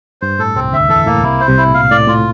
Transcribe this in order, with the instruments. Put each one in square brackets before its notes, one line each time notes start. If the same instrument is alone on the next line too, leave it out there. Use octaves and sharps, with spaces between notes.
[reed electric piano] G2 [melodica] C5
[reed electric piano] A2 [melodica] A4
[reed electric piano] C2 C3 [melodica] C4
[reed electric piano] D2 D3 [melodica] E5
[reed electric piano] E2 E3 [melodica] A4
[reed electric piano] A2 [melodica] A#3
[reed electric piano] C2 C3 [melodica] E4
[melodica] C5
[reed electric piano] C2 C3
[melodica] E4
[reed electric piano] A2
[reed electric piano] A#2 [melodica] F5
[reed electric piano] A2 [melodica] D5
[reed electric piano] A2 [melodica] F4